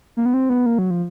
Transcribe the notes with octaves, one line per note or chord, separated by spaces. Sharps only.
A#3
B3
C4
B3
A#3
F#3
F3